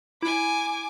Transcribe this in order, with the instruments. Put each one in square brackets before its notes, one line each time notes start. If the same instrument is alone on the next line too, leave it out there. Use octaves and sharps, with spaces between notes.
[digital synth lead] E4 [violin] G#5 D6